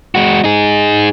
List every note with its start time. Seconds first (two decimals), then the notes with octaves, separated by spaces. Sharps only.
0.15 G#3 F#4
0.44 D#4 G#4